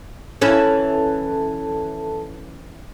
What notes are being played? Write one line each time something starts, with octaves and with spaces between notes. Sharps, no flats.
E3 C#4 E4 A4 A5